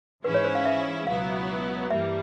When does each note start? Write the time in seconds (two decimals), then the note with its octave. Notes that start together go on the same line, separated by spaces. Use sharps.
0.24 G#2 E3 G#3 C#4 E4 B4
0.34 C#5
0.45 C5
0.55 F5
0.65 E5
1.07 C#2 B2 F#3 B3 E4 F5
1.90 G2 E3 G3 A#3 E5